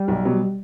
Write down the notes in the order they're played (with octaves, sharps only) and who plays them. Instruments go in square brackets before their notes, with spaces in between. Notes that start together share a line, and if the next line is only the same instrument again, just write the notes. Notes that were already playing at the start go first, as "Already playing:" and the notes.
Already playing: [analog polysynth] G3
[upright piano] B1
B2 F#3